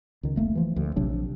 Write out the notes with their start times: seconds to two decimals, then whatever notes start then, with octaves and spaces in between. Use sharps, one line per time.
0.23 C#2 D#3
0.36 F1 A3 A#3
0.55 E3 F3
0.76 D2
0.96 A#1 C3 F#3 D4